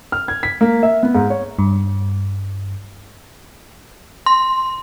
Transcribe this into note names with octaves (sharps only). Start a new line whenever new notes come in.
F6
G#6
B6
A#3
E5
B3
G#2
C#5
G2
C6